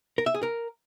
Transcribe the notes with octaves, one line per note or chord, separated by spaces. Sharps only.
A#4
E5
G#4
A#4